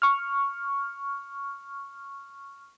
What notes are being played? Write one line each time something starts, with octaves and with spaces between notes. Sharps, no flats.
C#6 F6